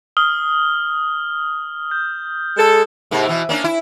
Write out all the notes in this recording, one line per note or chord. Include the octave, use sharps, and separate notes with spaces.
D#6 F6 G7
G6
G#3 A4
G#2 C3 A#3
B2 E3
A#3 C#4 D4
E4